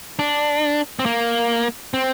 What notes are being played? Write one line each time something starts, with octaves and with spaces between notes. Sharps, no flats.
D4
C4
A#3
C4